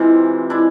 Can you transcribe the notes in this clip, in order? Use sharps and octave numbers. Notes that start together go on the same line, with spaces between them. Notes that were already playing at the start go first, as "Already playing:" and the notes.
Already playing: C3 E3 G#3 C4 F4
G#3 D4 E4